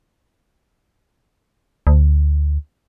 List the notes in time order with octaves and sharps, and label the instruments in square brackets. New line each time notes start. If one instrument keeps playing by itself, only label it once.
[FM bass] D2